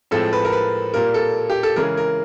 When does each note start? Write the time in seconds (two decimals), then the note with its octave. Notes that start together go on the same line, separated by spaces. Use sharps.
0.11 A2 F3 G#3 C4 A4
0.33 B4
0.45 A#4
0.52 B4
0.94 A#2 G3 A#3 A#4
1.14 A4
1.50 G4
1.63 A4
1.76 C#3 E3 G#3 A#4
1.97 A#4